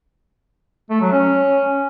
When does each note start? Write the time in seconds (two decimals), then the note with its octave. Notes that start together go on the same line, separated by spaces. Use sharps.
0.90 A3
1.01 F#3
1.12 C#4